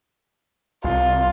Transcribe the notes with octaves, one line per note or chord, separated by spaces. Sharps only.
C2 F4